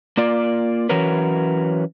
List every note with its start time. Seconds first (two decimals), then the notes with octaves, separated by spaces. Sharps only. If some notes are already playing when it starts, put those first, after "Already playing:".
0.17 A#3 F4 D5
0.89 E3 F#3 C#4 F#4 A#4 B4